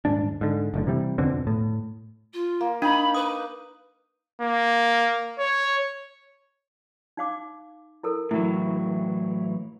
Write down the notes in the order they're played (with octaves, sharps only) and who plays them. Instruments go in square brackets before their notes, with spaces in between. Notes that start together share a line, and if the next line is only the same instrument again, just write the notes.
[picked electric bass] D#1 G#2 D4
G#2 D3
F#1 A2 D3
C3 E3 G3
F2 B2 D3 C4
A2
[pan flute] F4
[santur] A#3
[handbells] D4 [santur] D#4 [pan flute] B5
[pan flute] B4 [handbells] D#6
[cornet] A#3
C#5
[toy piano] D#4 F5 D6
E4 A4 A#4
[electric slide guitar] A2 E3 F#3 [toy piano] E4